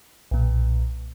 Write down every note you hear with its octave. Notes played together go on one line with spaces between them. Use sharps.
B1 A#2